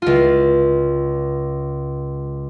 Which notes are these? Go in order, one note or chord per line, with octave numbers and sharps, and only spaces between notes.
C#2 F4